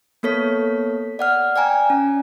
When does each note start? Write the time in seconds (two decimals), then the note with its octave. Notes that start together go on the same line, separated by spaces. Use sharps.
0.23 A#3 B3 A4 C#5 B6
1.19 D5 F#5 F6
1.56 D5 G5 G#5 A#5
1.90 C#4